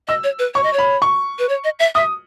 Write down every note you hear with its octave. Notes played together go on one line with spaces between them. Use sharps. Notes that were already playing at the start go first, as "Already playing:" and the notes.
D#5 E6
C#5
B4
C#5 C#6
D#5
C#5
B5
C#6
B4
C#5
D#5
E5
E5 D#6